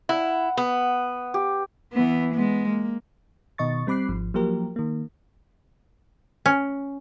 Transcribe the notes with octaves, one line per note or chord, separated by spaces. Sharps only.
E4 F#5
B3
G4
E3 B3
G#3 B3
A#3
B2 D#3 D#5 C#6 A6
G3 C4 B5 D6 F#6 C7
G#1 F3
F3 F#3 A#3 G4 A#4
D#3 A#3
C#4